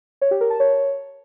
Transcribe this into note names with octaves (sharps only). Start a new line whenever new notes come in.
C#5
G4
A#4
A5
C#5